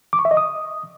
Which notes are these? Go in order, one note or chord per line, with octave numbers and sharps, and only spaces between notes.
D6
C#6
E5
D#5
D#6